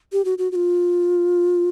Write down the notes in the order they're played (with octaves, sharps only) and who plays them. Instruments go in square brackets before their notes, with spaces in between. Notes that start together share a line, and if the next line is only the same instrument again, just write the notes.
[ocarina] G4
F#4
F#4
F#4
F4